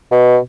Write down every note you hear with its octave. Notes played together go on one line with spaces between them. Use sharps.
B2